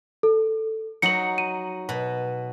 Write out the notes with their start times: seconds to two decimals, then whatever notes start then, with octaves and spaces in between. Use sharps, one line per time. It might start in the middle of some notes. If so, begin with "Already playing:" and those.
0.23 A4
1.02 F#3 D#4 C#7 F#7
1.38 D#7
1.89 B2